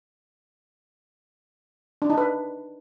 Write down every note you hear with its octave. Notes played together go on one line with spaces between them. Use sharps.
D4
D#4
B4